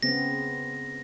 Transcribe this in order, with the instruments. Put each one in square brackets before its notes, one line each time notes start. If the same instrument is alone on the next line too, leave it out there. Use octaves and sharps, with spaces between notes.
[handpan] C#3 B3 C4 [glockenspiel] A#6